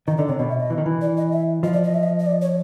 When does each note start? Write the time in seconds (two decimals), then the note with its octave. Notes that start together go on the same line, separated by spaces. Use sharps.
0.07 D#3 D#5
0.18 D3 D5
0.28 C3 C#5
0.39 B2 D#5
0.49 E5
0.59 D#5
0.70 E3
0.78 D#3
0.86 E3
1.01 D5
1.17 D#5
1.32 E5
1.63 F3 D#5
1.73 D5
1.84 D#5
1.94 E5
2.03 D#5
2.19 D#5
2.26 D5
2.42 C#5